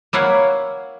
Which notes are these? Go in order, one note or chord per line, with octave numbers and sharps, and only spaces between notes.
A#3 E4 C#5 F5 F#5